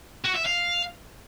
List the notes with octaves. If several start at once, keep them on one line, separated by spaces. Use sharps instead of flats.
F#4
E5
F5